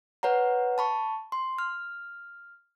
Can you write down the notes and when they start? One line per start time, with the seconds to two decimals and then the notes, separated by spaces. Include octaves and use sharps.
0.23 B4 C#5 F#5 A#5
0.78 A5 B5 C#6
1.32 C6
1.58 F6